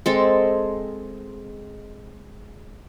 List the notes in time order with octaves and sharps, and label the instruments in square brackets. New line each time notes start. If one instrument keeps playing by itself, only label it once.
[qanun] G#3 C4 A4